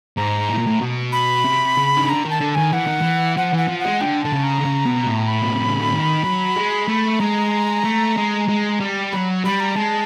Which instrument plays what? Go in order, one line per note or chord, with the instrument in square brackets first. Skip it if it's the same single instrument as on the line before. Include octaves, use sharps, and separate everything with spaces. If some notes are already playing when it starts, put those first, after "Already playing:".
[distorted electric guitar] G#2 [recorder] A#5
[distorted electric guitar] A2
A#2
A2
B2
[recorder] B5
[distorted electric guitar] C3
C#3
D#3
[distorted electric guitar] D3 [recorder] A#5
[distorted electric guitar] D#3
[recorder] A5
[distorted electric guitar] D3
[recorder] A5
[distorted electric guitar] D#3 [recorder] G#5
[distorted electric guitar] E3 [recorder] F#5
[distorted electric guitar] D#3
E3
[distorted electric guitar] F3 [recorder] F#5
[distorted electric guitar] E3 [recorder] F#5
[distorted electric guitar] F3
[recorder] F#5
[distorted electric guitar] G#3
[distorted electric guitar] D3 [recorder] G5
[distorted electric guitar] D3 [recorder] A5
[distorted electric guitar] C#3
[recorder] A#5
[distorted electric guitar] D3
C#3
B2
A2
[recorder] B5
[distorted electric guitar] B2
C3
C#3
D3
D#3
F#3
G#3
A3
[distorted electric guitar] G#3 [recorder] A#5
[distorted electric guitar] A3
G#3
G#3
G3
[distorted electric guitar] F#3 [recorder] B5
[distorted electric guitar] G3 [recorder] B5
[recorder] A#5
[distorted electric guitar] G#3 [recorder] A5